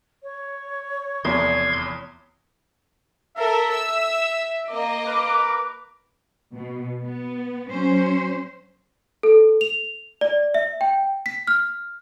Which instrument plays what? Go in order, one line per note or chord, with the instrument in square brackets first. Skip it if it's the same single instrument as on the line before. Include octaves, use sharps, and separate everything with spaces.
[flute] C#5
[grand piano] F1 E2 [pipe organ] C6 G#6
[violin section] A4 A#4 [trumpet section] E5
[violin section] E6
[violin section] A#3 D#5 [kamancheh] D6
[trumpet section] A#4 B4
[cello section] B2
B3
F#3 C#4 C5
[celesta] A4
F7
D5
E5
G5
B6
F6